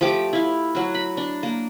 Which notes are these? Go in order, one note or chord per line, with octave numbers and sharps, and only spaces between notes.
F3 A3 G4 D6
E4 F5
F#3 F#4
B5
D4
A#3